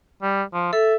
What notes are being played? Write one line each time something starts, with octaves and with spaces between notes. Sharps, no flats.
G3
F3
A4 E5